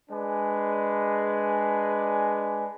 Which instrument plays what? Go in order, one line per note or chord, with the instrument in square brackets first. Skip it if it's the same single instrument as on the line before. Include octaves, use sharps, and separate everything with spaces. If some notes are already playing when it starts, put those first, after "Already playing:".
[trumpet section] G#3 D4 B4 D5 G#5